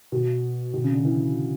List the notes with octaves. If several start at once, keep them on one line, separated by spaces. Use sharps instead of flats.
B2
B2
C#3
D3
E3